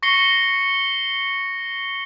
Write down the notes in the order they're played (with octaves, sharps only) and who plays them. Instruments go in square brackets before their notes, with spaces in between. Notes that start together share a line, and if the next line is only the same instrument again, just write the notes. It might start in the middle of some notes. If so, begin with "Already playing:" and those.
[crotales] C#6 A#6 C7 C#7 G7